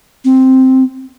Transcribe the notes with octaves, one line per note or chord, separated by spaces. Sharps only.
C4